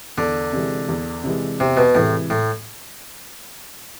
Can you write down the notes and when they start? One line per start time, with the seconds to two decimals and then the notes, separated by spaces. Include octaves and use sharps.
0.18 E2 D3
0.53 C3 E3 G#3
0.89 E2
1.24 C3 E3 G#3
1.60 E2 C3
1.77 B2
1.95 A2 C3 E3 G#3
2.30 A2